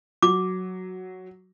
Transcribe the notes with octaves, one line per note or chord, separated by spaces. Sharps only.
F#3 D6